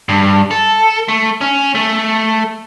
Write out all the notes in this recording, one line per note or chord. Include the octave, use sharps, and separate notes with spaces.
G2
A4
A3
C#4
A3